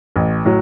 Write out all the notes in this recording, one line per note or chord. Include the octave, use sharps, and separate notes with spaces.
A1
A2 F#3